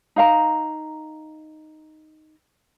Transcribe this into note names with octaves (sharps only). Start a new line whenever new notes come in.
D#4 F5 A#5